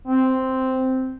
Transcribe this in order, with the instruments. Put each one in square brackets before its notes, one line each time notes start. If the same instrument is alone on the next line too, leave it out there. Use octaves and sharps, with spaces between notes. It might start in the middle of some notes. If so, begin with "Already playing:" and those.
[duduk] C4